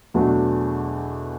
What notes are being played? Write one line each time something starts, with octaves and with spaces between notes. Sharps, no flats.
E2 B2 F#3 A3 D4